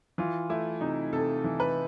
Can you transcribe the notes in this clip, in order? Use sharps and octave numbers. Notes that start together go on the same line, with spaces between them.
E3 F4
A3 E4
C3 D#4
C3 A4
E3
B4